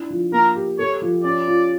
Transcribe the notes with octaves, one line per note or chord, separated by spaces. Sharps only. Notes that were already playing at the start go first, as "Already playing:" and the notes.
Already playing: D4 E4
F3
A#3 A#4
G4
A4 C#5
F3
C#4 D5
F4